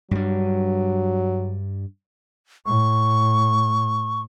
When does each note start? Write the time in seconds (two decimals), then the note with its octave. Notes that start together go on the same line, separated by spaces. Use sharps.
0.11 G2 F#3 G3
2.66 A2 C#6